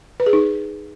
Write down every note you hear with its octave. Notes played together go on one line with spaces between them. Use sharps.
B4
G#4
D#4